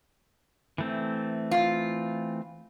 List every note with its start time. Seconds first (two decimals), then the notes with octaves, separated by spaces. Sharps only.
0.78 E3 A3 C4
1.51 F4